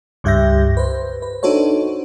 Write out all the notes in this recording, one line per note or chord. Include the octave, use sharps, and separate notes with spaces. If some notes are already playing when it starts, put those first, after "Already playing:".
C#2 G2 G4 E5 G6 A#6
B4 C5
B4
D4 D#4 F#4 A4 C5 C#5